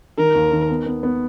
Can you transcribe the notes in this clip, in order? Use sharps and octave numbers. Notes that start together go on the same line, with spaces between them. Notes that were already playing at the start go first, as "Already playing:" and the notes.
D#3 A#4
D#2
D#3
B3
B3
B3